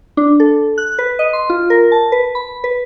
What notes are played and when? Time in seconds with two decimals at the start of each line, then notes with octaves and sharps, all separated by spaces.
0.17 D4
0.40 A4
0.78 F#6
0.99 B4
1.19 D#5
1.33 C6
1.50 F4
1.70 A#4
1.92 A5
2.12 B4
2.35 B5
2.64 B4